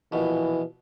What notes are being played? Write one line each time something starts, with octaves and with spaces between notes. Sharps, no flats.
A#1 B2 E3